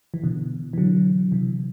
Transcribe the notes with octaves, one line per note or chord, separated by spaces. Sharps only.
E3
B2 D3
E3
D3 F#3
C3 E3